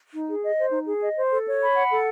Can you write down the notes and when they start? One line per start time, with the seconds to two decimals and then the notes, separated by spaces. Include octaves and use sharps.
0.14 D#4
0.29 G#4
0.43 D#5
0.58 C5
0.73 D#4
0.87 G#4
1.01 D#5
1.16 C5
1.31 A4
1.46 C#5
1.61 B5
1.75 F#5
1.90 A4